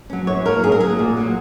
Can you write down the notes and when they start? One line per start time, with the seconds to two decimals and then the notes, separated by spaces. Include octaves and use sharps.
0.10 F#3 C#4
0.27 F#2 C#5
0.45 F#3 A#3 A#4
0.63 F#2 G#4
0.72 A#4
0.80 F#3 A#3 G#4
0.99 A#2
1.17 F#3 A#3